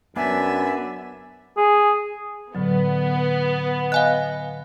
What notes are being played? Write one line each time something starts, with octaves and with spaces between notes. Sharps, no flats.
F#2 B3 D4 D5 E5 G#5
G#4
A2 D3 F#3 B3
D#5 F5 G#5 F#6